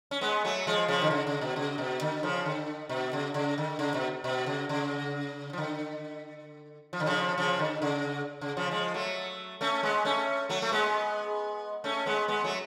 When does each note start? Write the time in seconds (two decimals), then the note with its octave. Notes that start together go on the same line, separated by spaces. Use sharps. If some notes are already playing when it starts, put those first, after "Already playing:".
0.11 C#4
0.21 G#3 B3
0.45 F#3 A3
0.67 F3 G#3
0.88 C#3 F3
1.01 D3
1.11 C#3
1.27 C#3
1.41 B2
1.56 C#3
1.78 B2
2.01 D3
2.23 C#3 F3
2.46 D3
2.89 B2
3.13 C#3
3.34 C#3
3.58 D3
3.79 C#3
3.94 B2
4.24 B2
4.46 C#3
4.69 C#3
5.53 F3
5.58 D3
6.93 F3
7.00 D3
7.07 C#3 F3
7.38 C#3 F3
7.59 D3
7.82 C#3
8.41 C#3
8.57 C#3 F3
8.71 F3 G#3
8.94 F#3 A3
9.61 A3 C#4
9.83 G#3 B3
10.05 A3 C#4
10.49 F#3 A3
10.62 A3
10.72 G#3 B3
11.84 A3 C#4
12.06 G#3 B3
12.28 G#3 B3
12.44 F#3 A3